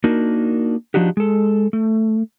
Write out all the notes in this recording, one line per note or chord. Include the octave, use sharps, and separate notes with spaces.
A#3 D4 D#4 F#4 A#4
F3 D4 D#4 F#4 G4
G#3 A4
A3